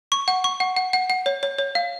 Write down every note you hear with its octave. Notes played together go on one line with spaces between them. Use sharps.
C#6
F#5
C#6
F#5
F#5
F#5
F#5
C#5
C#5
C#5
F5